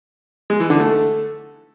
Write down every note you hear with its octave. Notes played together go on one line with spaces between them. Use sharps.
G#3
E3
D3
A3